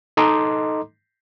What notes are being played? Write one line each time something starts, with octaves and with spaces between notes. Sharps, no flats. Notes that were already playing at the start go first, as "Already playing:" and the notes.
D#4 A4 D#5 A#5 C6 D6